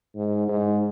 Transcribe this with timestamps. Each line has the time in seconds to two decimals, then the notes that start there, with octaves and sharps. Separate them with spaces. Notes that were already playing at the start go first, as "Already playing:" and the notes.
0.15 G#2
0.48 G#2